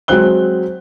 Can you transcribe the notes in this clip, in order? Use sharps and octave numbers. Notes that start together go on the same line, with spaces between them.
F#3 G#3 C4 F#6 G7